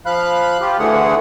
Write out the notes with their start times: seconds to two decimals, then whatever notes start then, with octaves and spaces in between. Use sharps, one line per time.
0.06 F3 F5 B5 F#6
0.61 F4 G4
0.79 D2 D3 E3 A3 G#4 F#5